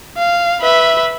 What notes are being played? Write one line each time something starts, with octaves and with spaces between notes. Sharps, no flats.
F5
B4 E5